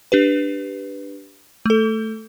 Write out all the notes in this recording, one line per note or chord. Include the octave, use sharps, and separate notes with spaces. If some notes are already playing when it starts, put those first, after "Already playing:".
D4 G4 B4
A3 A4